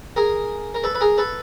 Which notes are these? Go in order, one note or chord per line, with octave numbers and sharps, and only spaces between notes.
G#4 A#4
A#4
A4 B4
B4
G#4 A#4
A4 B4